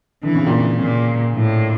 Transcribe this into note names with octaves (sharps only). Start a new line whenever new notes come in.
D3 E3
C#3
A#2
C#3
A#2 C#3
A2